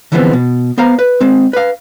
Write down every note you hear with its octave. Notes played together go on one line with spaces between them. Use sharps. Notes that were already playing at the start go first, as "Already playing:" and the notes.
D3 E3 F3 G#3 B3 C4
B2
B3 C5 F5 A#5
B4
G#3 C4
B4 F5